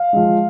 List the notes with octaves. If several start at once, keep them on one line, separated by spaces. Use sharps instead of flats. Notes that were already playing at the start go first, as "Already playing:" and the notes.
Already playing: F5
F3 G#3